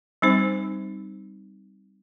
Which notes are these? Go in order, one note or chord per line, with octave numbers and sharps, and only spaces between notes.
G3 C4 D#4 C5